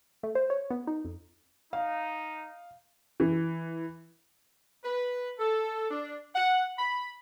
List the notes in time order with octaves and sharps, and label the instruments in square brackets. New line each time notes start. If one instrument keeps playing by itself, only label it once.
[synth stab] A3
C5
C#5
B3
D#4
F2
[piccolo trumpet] D#4 [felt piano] F5
[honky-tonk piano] E3
[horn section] B4
A4
D4
F#5
B5